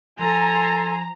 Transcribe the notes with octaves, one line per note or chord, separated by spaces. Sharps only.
F3 A4 G#5 A#5 C6